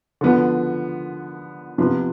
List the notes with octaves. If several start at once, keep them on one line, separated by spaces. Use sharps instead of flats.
D3 F3 B3
C3 F3 B3 F4 B4